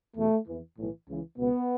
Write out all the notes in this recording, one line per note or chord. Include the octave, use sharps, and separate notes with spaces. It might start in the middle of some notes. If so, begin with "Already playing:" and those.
E2 B2 A3
E2 E3
B1 A2 E3
C#2 C#3 E3
C#2 B2 B3